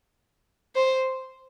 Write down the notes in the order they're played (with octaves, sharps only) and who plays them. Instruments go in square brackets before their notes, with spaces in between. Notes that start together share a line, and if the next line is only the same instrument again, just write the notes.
[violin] C5